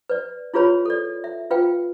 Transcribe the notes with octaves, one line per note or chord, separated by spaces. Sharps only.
B4 D5
E4 F4 G#4 B4 C#5 B5
A4 D5
E5
F4 B4 F5 G5